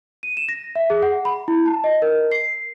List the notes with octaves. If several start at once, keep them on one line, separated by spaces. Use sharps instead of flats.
D#7
E7
A#6
E5
G#4
F#5
B5
E4
A5
D#5
A#4
C7